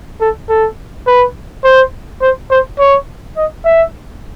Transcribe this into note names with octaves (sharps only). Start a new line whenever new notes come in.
A4
A4
B4
C5
C5
C5
C#5
D#5
E5